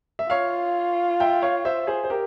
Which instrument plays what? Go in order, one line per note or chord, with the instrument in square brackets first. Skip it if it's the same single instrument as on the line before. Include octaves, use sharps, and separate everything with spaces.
[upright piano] E5
[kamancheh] F4 [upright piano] C#5 F5
[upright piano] E5 G5
C#5 F5
C5 E5
G#4 C5
C5
G4 A#4